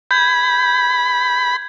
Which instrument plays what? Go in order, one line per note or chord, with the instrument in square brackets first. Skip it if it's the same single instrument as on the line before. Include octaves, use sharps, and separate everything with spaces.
[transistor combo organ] B5 [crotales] G6 G#6